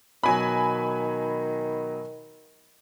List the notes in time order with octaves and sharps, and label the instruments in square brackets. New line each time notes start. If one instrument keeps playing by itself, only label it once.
[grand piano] B2 F#3 [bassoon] D#3 [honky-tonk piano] G#5 B5